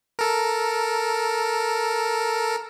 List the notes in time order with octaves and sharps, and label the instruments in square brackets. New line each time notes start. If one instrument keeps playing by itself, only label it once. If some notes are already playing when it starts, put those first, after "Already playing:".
[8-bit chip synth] A4 A#4